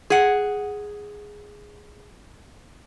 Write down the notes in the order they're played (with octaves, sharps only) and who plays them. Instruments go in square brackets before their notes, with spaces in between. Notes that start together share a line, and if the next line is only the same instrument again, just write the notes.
[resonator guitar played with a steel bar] G#4 F#5